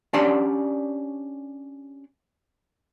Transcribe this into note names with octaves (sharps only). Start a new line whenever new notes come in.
C#4 D4 G4 D5 F#5 C6